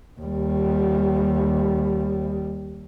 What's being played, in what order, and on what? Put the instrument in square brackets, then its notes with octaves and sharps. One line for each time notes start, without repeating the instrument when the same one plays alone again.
[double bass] D#2 G3